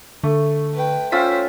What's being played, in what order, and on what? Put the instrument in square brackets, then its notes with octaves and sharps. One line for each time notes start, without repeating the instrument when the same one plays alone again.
[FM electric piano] D3 [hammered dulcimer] A3
[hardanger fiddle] B4 G5
[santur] C#4 F4 E5 [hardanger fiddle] C5 G5 [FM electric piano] B6